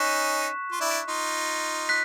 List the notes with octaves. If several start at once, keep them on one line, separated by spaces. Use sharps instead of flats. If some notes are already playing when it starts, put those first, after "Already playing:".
Already playing: C#4 D#4 C#6 F#6 B6 E7
F4
D4 E4
D#4 F4
F#6 B6